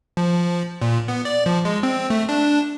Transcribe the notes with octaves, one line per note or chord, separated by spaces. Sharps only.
F3
A#2
B3
D5
F3
G#3
C4
A3
D4